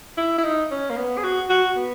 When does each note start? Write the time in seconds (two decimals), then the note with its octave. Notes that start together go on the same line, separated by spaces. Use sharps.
0.18 E4
0.38 E4
0.44 D#4
0.71 C#4
0.90 A#3
0.97 B3
1.18 G#4
1.24 F#4
1.50 F#4
1.76 B3